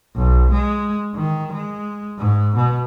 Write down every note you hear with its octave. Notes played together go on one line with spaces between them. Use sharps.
B1
G#3
D#3
G#3
G#2
B2